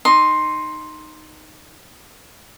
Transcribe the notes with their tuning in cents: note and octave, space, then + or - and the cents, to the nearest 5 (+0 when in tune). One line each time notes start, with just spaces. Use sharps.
D#4 -10 C6 +5